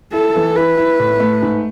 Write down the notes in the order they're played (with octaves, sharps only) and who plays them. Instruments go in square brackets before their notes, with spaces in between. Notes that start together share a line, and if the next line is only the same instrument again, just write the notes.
[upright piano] E4 [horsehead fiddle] A4
[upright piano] E3
[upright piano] E4 [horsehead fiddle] B4
[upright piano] E4
A2
A3
G#2